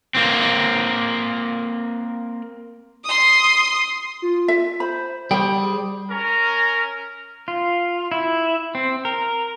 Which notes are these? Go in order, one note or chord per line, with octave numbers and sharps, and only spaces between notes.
A#3 C4
C6 D#6
F4
E5
C5 B5
G3 C5 G5 D#6
G#4
C#4 A#4
F4
E4
C4
A#4